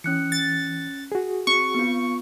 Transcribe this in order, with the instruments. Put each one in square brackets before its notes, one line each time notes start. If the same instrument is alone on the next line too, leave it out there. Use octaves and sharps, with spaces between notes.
[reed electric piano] E3 [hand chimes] C#4 F#6 C#7
[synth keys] A6
[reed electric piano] F#4 G#4
[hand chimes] C4 [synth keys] C#6
[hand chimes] B3 F4